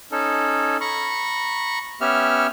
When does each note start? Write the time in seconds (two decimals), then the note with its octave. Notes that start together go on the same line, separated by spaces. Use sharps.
0.12 C#4 D#4 A4
0.81 A#5 B5 C#6
2.01 B3 C#4 G4 E5 F6